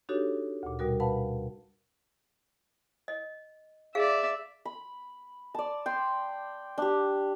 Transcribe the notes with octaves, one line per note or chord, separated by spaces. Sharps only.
D4 D#4 F#4 G4 A4 C#5
D2 A#2
B2 G3 F#4 A#4
B4 F5 F#5 A5 B5
D#5
G#4 D5 E5 F5
B5
D5 A5
G5 C6
D4 G4